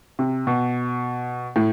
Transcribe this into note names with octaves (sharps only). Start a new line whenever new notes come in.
C3
B2
A2